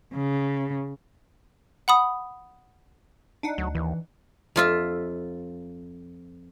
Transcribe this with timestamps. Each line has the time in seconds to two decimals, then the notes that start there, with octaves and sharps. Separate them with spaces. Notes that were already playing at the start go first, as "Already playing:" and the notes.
0.14 C#3
1.88 F#5 B5 D#6
3.43 D4 D#4 F#5
3.58 D2 F#3
3.75 D#2 E3
4.56 F2 F4 E5